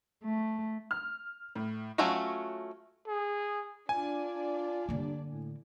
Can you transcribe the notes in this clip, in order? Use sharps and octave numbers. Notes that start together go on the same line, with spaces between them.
A3
F6
A2
F#3 A3 C#4 F4 F#4
G#4
D4 F4 D5 G#5
G2 D3 A#3
A2